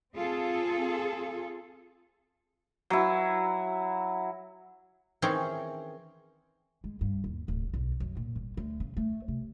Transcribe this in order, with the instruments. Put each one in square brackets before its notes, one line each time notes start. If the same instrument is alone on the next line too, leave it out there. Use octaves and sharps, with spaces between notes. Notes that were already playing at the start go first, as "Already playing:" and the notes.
[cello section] C4 F4 G#4 A4
[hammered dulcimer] F#3 E4
[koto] D#3 E3 C4 C#4 G#4
[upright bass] G#3
G2
D#2
D1
B1
F#2
A#2
G1
D2
C#3
A3
C3